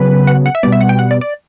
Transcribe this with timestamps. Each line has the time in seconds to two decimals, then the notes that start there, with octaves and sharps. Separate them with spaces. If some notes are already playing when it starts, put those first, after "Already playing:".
Already playing: C#3 F#3 B3 B4
0.27 F#5
0.46 F#5
0.55 E5
0.63 B2 G3 B3 D5
0.72 E5
0.81 F#5
0.89 G5
0.99 F#5
1.11 D5
1.21 D5